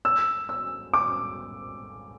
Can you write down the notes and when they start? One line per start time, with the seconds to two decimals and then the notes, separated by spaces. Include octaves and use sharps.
0.05 E6
0.49 E6
0.94 D6